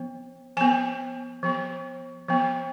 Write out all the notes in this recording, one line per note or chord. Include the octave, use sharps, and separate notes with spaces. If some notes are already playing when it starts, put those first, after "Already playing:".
Already playing: F3 B3
F3 B3 G#5
F3 B3
F3 B3